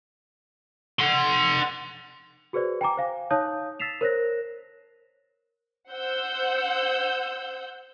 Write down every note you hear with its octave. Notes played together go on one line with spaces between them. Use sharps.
F#5 C6
F#4 G#4 B4 C5 D5
G5 G#5 A#5 D6
C5 F5 G#5
D#4 C#5 F5 A5 D#6 G6
E6 A6 B6 C7 E7 F7
A#4 C5 C#5 F#6 A#6
C5 F#5 E6 G6